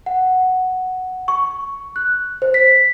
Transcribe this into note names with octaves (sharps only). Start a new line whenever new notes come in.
F#5
C#6
F#6
C5
B6